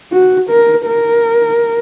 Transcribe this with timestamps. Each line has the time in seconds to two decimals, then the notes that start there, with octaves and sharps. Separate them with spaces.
0.12 F#4
0.49 A#4
0.86 A#4